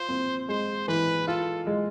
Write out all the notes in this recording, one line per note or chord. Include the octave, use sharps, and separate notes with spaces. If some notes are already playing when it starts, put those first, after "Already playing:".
Already playing: F4 C5
C4
G#3 C5
E3 B4
F4 A4
G#3